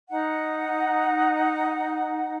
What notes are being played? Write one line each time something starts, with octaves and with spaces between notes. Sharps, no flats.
D#4 F#5